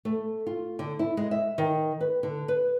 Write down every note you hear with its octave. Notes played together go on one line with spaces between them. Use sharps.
A3
F4
D3
E4
G#3
E5
D#3
B4
D3
B4